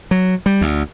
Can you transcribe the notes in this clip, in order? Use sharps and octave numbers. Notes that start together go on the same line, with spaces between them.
F#3
G3
D2